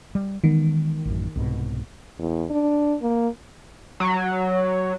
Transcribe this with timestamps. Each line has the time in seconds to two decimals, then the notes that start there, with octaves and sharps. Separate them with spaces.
0.15 G3
0.44 D#3 E3 G#3 B3
1.05 A1 F#2
1.36 C2 G#2 B2
2.19 E2
2.50 D4
3.02 A#3
4.00 F#3